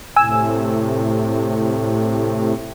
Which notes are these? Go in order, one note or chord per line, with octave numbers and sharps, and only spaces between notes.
A2 C3 G#5 E6